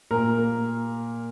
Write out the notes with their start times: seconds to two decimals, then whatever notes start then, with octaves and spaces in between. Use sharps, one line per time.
0.11 A#2 A#4
0.38 A#3